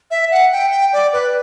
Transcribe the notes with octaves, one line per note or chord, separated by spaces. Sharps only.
E5
F#5
G5
G5
D5
B4